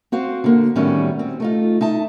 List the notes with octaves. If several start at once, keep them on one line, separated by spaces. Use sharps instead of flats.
C4 F#4 C5 F5
D3 A#3
A2 D#3 F#3 G3 B3 C#4
C4
A3 D#4 F4
D#4 E5 A5